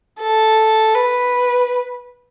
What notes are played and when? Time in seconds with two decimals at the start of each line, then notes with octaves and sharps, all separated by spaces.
0.20 A4
0.95 B4